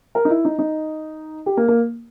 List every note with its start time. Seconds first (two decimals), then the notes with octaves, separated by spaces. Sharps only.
0.15 A#4
0.25 D#4
0.30 E4
0.45 D#4
0.59 D#4
1.46 G4
1.57 A#3
1.68 A#3